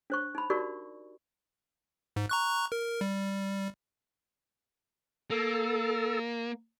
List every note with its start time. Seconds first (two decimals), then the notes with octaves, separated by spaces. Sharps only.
0.10 D4 C5 C#6
0.35 D#4 B5
0.50 D#4 F#4 G4 A#4 D5 C#6
2.16 G#2
2.29 A#5 C#6 F#6
2.72 A#4
3.01 G3
5.30 A#3 A4